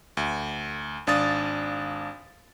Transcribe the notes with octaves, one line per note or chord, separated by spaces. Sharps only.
D2
G#1 D4 F5 D#6 A6